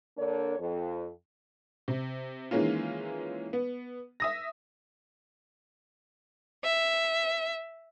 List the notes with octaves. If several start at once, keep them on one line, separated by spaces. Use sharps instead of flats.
D3 A#3 D4 A#4 C#5
F2
C3
D#3 E3 G#3 A#3 C#4 F4
B3
E5 D#6 A#6
E5